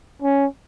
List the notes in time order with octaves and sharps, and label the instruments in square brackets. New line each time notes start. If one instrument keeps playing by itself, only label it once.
[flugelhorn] C#4